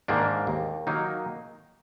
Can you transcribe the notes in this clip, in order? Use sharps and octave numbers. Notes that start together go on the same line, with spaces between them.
G#2 D#3 A#3 D4
D#2
D#3 F#3 A#3 D#4